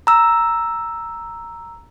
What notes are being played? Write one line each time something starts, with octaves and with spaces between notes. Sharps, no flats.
A#5 E6